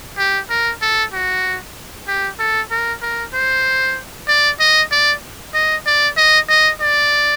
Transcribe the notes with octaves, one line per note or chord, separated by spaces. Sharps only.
G4
A#4
A4
F#4
G4
A4
A#4
A#4
C5
D5
D#5
D5
D#5
D5
D#5
D#5
D5